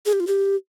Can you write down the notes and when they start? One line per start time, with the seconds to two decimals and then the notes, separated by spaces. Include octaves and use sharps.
0.06 G#4
0.13 G4
0.20 F4
0.27 G4